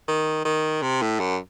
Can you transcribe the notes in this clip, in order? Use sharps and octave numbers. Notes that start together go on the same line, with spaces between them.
D#3
D#3
C3
A2
F#2